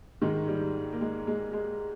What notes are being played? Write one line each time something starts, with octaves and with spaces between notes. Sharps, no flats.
G#2 D#3 G#3
G3
A#3
G#3
G#3
G#3